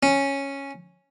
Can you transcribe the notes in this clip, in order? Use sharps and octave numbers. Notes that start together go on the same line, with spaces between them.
C#4